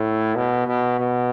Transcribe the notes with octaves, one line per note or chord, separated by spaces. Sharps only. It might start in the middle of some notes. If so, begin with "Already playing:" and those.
Already playing: A2
B2
B2
B2